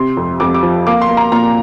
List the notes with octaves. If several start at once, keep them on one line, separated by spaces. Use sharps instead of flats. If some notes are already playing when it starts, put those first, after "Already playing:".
Already playing: C3 C6
F2
F2 D6
D6
F3
A#3 D6
C6
A#3
A#5
A#2 A#5